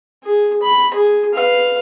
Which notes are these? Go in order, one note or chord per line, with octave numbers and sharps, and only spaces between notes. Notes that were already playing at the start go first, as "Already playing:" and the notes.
G#4
B5
G#4
B4 F5